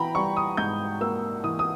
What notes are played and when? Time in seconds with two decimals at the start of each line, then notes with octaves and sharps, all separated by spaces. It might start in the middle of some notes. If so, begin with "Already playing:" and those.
Already playing: E3 G5 A#5 B5
0.15 G3 C#6
0.37 D#6
0.57 G#2 G6
1.01 A#3 E6
1.44 E3 D#6
1.59 D#6